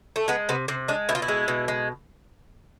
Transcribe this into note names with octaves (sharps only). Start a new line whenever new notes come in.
A3
G#3 B3
C3 B3
C3 C4
G#3 D4
B2 E4
F4
E4
G#3
B2
G#3